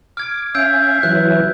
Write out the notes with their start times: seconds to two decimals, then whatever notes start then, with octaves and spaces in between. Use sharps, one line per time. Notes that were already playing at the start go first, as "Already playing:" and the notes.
0.17 D6 F6 G#6
0.55 C#4 E5 F5 E6 G6 D7
1.03 E3 F#3 F#6